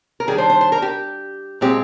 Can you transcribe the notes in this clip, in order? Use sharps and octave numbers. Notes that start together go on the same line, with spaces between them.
A#4
D#3 G3 D4 G#4
C5
C5
C5
A#4
G4
A#2 G#3 C4 G4